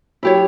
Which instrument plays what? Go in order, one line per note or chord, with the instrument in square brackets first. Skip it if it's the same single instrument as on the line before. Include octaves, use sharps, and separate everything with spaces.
[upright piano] F#3 [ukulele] E4 G4 C#5